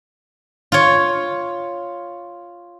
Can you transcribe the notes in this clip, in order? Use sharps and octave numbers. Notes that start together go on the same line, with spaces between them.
F4 C#5